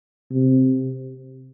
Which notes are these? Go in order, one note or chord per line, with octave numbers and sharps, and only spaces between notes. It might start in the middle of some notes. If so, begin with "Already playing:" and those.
C3